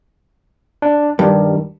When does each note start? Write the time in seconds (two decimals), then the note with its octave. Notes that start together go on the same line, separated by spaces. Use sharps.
0.82 D4
1.19 G2 D#3 G3